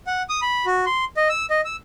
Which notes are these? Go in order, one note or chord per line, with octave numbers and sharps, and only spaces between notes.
F#5
D#6
B5
F#4
C6
D#5
E6
D#5
E6